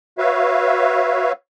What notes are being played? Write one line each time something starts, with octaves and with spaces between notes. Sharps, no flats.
F#4 B4 C#5 E5 F5